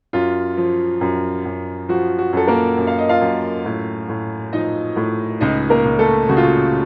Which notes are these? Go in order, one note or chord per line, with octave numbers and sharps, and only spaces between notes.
F#2 F4
F3
F#2
F#2
F3 F#4
F#4
F#2 A4
A#3 A#4
F#2
F5
D#5
F4 F5
F#2
A2
A2
F3 D#4 D#5
A2
C#2 D#4 D#5
A#3 A#4
C#2
A3 A4
C#3 F#4
F4
F#4